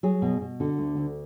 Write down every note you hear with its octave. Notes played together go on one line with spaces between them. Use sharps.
F#3 G#4
B2
B2
D3 F#4
D2
D2